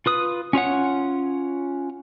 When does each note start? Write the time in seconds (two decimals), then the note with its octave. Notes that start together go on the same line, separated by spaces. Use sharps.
0.06 F4 B4 D#6
0.53 C#4 F4 C#5 F#5